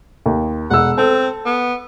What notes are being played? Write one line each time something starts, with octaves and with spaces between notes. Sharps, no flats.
D#2
E1 F#5 E6
C4 A4
B3